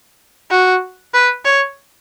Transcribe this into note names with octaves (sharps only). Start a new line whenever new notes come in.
F#4
B4
C#5